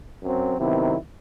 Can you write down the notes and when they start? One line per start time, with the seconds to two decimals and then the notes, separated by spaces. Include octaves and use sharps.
0.21 F#2 F#3 C4
0.58 C3 D#3 F#3 B3 E4